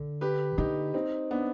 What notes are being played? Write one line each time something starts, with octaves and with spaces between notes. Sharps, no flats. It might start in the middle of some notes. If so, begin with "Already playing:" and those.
Already playing: D3
G4 B4
D3 D#4 G4
C4 D#4
B3 D4